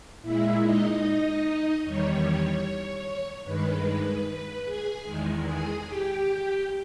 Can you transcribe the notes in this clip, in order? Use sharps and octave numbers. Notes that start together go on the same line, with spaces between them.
A#2 G#3 E4 E5
D#4 D#5
E2 D#3 G3 C#5
G2 D#3 G#3 B4
B4
B4
G#4 G#5
E2 D#3 G#3
G#4 G#5
G4 G5